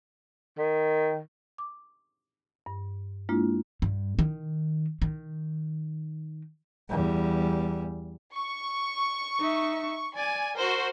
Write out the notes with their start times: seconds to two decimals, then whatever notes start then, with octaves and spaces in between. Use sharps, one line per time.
0.58 D#3
1.58 D6
2.66 G2
3.29 G#3 A#3 D4 E4 F4
3.82 G2
4.19 D#3
5.02 D#3
6.89 E2 G3
8.34 C#6
9.40 D#4 E5
10.16 D5 G#5
10.56 F#4 A#4 C5